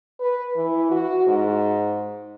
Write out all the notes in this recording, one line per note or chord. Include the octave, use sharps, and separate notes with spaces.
B4
E3
F#4
G#2